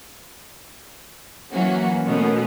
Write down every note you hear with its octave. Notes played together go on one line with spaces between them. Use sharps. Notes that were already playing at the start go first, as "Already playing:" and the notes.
E3 F#3 A#3 C#4 F#4
B2 A3 B3 C#4 A#4